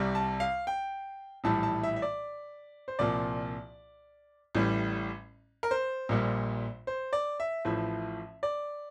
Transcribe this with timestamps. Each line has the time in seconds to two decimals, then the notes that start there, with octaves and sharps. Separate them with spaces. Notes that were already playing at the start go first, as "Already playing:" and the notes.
Already playing: C2 C3 G3
0.15 A5
0.40 F5
0.67 G5
1.44 A#1 A2 E3 G3 A5
1.63 A5
1.83 E5
1.96 E5
2.02 D5
2.88 C5
2.99 C2 A#2 F3 D5
4.55 A1 A2 G3
5.63 A#4
5.71 C5
6.09 A#1 A#2 G3
6.87 C5
7.13 D5
7.40 E5
7.65 A1 A2 F3 E5
8.43 D5